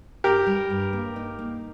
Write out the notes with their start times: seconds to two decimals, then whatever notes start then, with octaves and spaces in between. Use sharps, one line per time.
0.24 G2 G4 A#4
0.47 G3
0.70 G2
0.93 A#3
1.16 D#4
1.39 A#3